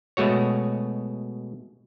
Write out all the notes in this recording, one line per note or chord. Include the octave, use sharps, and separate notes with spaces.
B2 G#3 A3 F#4 C#5